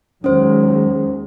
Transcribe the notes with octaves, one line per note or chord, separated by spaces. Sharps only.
D#2 F#3 G#3 C#4 C5